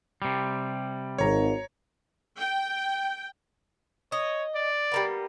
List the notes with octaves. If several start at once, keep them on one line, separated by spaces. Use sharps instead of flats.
C3 G3
G#1 C#5 A#5
G5
C#5 D#5
D5
G3 A#3 B3